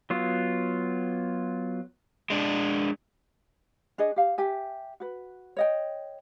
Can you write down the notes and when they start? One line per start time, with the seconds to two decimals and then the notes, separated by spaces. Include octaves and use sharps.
0.10 F#3 B3 F4
2.30 G#3 D4
3.98 D4 G#4 C#5 D#5
4.16 G4 F5
4.38 G4 E5 G#5
5.00 F#4 B4
5.57 C#5 D#5 G5